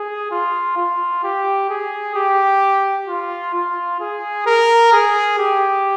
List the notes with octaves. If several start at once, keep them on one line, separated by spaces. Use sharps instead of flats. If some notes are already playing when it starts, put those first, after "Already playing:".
Already playing: G#4
F4
F4
G4
G#4
G4
F4
F4
G#4
A#4
G#4
G4